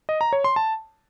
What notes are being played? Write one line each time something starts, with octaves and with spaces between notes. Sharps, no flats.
D#5
A#5
C#5
C6
A5